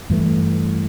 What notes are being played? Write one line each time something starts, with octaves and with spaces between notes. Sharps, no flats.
G2 E3 A3